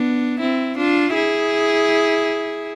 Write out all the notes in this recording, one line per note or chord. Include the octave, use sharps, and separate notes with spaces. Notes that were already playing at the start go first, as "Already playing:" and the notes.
Already playing: B3 D4
C4 E4
D4 F4
E4 G#4